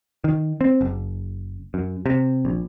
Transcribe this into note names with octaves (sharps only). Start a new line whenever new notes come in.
D#3
C4
F#1
F#2
C3
A#1